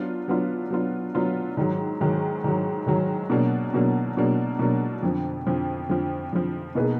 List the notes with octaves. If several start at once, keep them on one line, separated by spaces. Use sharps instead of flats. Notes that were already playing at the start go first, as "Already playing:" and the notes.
Already playing: F#3 B3 D4 F4
F#3 B3 D4 F4
F#3 B3 D4 F4
F#3 B3 D4 F4
G#2 D#3 F#3
G#2 D#3 F#3
G#2 D#3 F#3
G#2 D#3 F#3
B2 F#3 A#3 D4
B2 F#3 A#3 D4
B2 F#3 A#3 D4
B2 F#3 A#3 D4
F2 D3 F3
F2 D3 F3
F2 D3 F3
F2 D3 F3
B2 A#3 D#4 G#4 B4